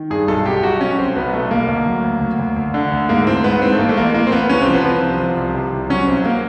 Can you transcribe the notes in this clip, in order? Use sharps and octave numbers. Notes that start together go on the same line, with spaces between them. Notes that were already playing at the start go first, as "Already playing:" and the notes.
Already playing: D#3
G2 G#4
B1 A4
B1 G4
G4
B1 F#4
F#3 C#4
B1 C4
B1 B3
B1 A3
B1 A#3
D2
F#3
D2
D2
D2
D2
D3
D2
G#2 A#3
E3 C4
C4
G#2 B3
G#2 C4
A3
A1 A#3
A3
A1 A#3
E3 A#3
C4
E3 B3
C2 C#4
C4
F3
B3
F3 C4
C2
F3
C2
C3
C2
F#3 C#4
B1 C4
A#3